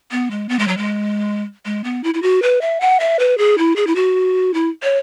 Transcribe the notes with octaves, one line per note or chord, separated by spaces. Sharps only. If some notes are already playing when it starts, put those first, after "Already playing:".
B3
G#3
B3
G#3
F#3
G#3
G#3
B3
E4
E4
F#4
B4
E5
F#5
E5
B4
G#4
E4
G#4
E4
F#4
E4
C#5